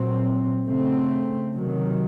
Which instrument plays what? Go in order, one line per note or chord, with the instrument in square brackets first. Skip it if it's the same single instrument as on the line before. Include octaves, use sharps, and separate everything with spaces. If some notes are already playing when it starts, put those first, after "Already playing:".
Already playing: [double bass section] A#2 F#3 C4
C#3 A3 C4
C3 D#3 F#3